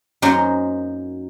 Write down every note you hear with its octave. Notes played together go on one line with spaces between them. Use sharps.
F#2 F#3 A#3 D#4 C5 C6